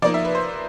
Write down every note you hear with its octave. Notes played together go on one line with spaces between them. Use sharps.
F3 A#3 D#4 D5
E5
B4
C5